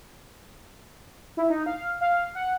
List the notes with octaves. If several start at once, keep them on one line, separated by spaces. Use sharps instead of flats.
E4
D#4
F5
F5
F#5